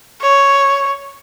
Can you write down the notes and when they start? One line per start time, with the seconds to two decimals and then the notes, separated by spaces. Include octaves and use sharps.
0.21 C#5